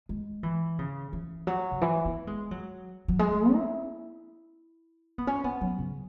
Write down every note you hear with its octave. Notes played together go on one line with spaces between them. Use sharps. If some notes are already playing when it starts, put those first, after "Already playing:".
G#3
E3
C#3
E3
F#3
C#3
E3
B3
G#3
F#3
F#3
G#3
E4
B3
C#4
B3
F#3
C#3